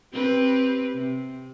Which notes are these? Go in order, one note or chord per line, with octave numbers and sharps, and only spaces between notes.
C4 G4 B4
C3